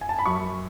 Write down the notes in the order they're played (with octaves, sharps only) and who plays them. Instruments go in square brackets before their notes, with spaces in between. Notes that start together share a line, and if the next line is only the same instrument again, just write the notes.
[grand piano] G#5
A5
B5
F#2 C#6